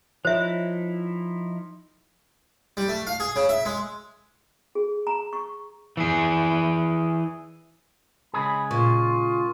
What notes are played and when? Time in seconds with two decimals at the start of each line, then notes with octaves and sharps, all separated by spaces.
0.25 F3 D#4 E4 C5 C#5 E5
2.77 G3
2.88 A3
3.07 F5
3.20 G#4
3.36 C#3
3.49 E5
3.65 G#3
4.75 G#4
5.07 A#5
5.33 C#6
5.97 E3 G#4
8.34 C#3 G#3 G#4 B5
8.71 A#2 F4 C#6